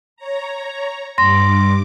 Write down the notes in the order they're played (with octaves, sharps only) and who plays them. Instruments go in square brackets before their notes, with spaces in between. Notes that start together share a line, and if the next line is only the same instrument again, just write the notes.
[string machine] C#5 A#5
[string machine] G2 D6 [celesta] C6 A#6